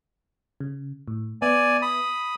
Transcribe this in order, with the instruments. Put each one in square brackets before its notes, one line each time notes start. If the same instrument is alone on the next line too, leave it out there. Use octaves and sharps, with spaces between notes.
[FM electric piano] C#3
A2
[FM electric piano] B3 E5 [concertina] D5 G#5
[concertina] B5 D#6